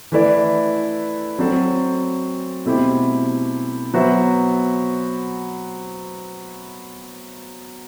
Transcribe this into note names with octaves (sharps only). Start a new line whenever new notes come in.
E3 A3 E4 B4 D5
F#3 C4 F#4 A4 C5
B2 A3 C4 E4 G4
F#3 B3 F#4 C5 E5